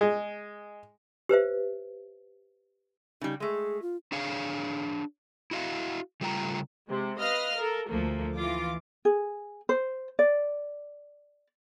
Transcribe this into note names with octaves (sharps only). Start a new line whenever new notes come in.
G#3
G4 B4 C5 E5
C#3 G3 D#4
G#3 A3 G#4
F4
D4 G#4 C#5 F5
E4 F#4 D#5 F5
C#3 G3 A3 F4 G5 A#5
C3 G#3
B4 D#5 F5 D#6 F6
A4 A#4
D2 F3 A3 A#3
E3 F4 D6
G#4
C5
D5